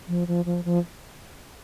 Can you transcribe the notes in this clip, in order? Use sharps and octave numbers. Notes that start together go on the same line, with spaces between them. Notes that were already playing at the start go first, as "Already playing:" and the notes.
F3
F3
F3
F3